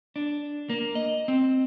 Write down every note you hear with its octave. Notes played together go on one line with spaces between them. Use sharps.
D4
A#3
D#5
C4